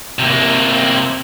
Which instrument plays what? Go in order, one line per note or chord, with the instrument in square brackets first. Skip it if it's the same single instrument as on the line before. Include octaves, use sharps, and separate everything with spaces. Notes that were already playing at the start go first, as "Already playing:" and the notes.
[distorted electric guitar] C3 A#3